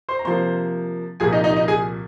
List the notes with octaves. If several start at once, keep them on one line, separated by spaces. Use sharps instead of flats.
C5 C6
A#5
C3 F3 A#3 C5 C6
C2 A#2 F3 G#4 G#5
D#4 D#5
D#4 D#5
D#4 D#5
G#4 G#5